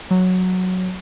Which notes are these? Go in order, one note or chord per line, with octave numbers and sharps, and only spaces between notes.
F#3